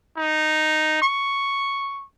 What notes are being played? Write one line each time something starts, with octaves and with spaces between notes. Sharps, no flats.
D#4
C#6